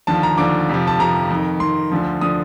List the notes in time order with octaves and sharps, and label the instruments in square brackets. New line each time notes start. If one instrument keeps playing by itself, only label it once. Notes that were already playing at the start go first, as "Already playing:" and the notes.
[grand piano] D#2 D3 F3 A5
A#5
D#2 D3 F3 D6
F2 C3 F3
A5
F2 C3 F3 A#5
F2 D#3
F2 D#3 C6
D2 D3 F3
D3 F3 D#6